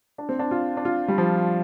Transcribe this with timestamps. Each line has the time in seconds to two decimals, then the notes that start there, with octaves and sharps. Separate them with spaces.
0.18 D4
0.29 C4
0.39 D4
0.51 F4
0.77 D4
0.85 F4
1.08 G3
1.18 F3